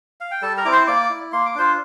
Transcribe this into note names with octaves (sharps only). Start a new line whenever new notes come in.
F5
G5
G3 A4 A5
A#4 A#5
C4 E4 D6
C5 C6
A#3 D5 D6
E4
A#3 C6
D6
D4 F4 C5 C6